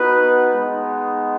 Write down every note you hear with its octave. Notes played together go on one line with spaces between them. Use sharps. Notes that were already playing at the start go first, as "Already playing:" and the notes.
Already playing: B3 D#4 F#4 B4
G#3 B3 D#4